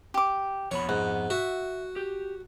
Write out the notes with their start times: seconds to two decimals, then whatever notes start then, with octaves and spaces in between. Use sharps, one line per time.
0.14 G4 D6
0.71 F2 B3 C#5 B5
0.89 G#2 F#5
1.30 F#4 E5
1.96 G4